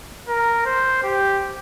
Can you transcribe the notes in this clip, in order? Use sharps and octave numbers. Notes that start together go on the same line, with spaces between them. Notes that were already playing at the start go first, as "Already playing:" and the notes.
A#4
C5
G4